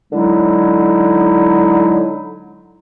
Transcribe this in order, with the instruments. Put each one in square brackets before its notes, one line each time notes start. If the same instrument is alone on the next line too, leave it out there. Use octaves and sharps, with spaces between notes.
[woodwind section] D3 F#3 G#3 D#4 E4